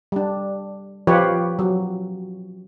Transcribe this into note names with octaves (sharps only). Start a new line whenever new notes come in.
G3 D4
F3 F4 G4 B4 C#5
F#3